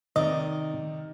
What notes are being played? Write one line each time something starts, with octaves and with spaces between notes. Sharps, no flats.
C3 D#3 D#4 D5 D#5